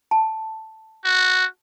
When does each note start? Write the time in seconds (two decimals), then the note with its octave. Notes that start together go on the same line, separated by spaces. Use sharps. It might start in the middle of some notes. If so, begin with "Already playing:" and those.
0.11 A5
1.04 F#4